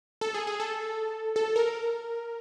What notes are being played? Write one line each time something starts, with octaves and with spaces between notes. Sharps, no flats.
A4
G#4
G#4
A4
A4
A#4